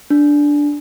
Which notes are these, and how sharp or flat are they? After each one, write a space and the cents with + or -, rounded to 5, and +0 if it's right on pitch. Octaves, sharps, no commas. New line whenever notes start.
D4 -5